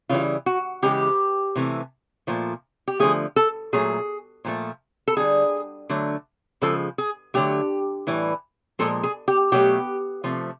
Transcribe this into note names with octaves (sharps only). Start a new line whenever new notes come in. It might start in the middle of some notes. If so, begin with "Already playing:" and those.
C#3 E3 G3 F4
F#4
C#3 E3 G#3 G4
C3 E3 A3
A#2 F3 A3
G4
D3 F3 A3 G#4
A4
A#2 F#3 A3 G#4
A#2 F3 A3
A4
D3 G3 G#4
D3 F#3 A3
C#3 F3 G#3 A4
G#4
D3 F#3 A3 G4
A2 E3 G3
A#2 F3 G#3 A4
G#4
G4
B2 F#3 A3 G4
C3 F3 A3